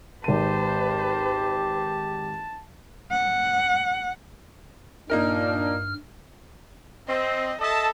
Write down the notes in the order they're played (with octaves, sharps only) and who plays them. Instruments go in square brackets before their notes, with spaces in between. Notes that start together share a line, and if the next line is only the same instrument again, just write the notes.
[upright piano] G#1 D#7 [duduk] G4 [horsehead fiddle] B4 C5 [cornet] A5
[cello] F#5
[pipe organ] G2 F6 [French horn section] A#2 D4 [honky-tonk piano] A#3 D#4 A#4
[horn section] C4 [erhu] D#5
[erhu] A4 [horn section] D#5 E5 A5